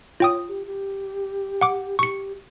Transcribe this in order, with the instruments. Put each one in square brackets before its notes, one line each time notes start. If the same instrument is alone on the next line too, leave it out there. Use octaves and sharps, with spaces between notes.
[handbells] F4 G5 D#6 [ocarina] C#5
[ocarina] G4
G4
[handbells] F#5 D6
[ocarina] G4 [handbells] C#6 C#7